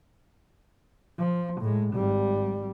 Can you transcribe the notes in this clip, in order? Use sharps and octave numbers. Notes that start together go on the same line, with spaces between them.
F3
A2 G#3
G#1 G3